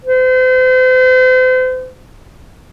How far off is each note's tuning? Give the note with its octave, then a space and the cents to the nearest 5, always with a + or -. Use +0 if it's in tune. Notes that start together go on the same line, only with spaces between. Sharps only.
C5 -40